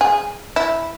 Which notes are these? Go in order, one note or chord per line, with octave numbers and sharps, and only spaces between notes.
G#4
E4